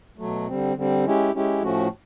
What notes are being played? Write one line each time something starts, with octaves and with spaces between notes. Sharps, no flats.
B2 F#3 A3
D3 G3 C4
D3 G3 C4
G#3 C#4 E4 G4
G#3 C#4 E4 G4
A2 F3 A3 C#4 F#4